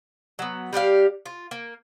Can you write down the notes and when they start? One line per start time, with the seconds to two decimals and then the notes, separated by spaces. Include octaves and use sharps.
0.39 F#3 B3
0.73 G3 D4 G4 F5
1.26 F4
1.51 A#3